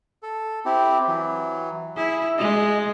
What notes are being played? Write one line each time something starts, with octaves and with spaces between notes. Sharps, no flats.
A4
C4 E4 G4
E3 F#3
E4 G#4
G#3 D#5